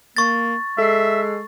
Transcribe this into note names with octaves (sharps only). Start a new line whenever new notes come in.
A#3 C#6 A6
G#3 A4 E5 C7